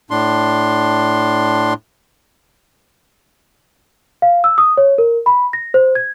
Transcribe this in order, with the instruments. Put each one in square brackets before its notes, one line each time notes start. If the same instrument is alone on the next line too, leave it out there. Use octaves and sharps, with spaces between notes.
[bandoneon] A2 D4 C6
[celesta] F5
E6
D#6
C#5
A#4
B5
A#6
C5
G#6